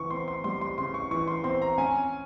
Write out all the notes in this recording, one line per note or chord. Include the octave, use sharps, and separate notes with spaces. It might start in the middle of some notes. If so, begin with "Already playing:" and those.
Already playing: C#3 E3 C#6
C4 C6
C6
G3 C6
C6
C#3 C6
C#6
E3 C#6
C6
C4 C6
A#5
C#4 G#5